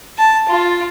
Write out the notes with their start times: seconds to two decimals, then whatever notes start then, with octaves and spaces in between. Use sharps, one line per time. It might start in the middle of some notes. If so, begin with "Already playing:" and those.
0.18 A5
0.49 F4